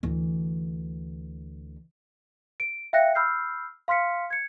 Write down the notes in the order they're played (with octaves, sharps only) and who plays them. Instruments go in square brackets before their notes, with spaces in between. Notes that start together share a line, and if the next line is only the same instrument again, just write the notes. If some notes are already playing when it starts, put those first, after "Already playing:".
[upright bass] D2 E3
[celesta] D7
E5 F5 G5 F#6 A#6 C#7
B5 E6 F6 G6 C7
F5 C6 F6 B6 C#7
G#6 C#7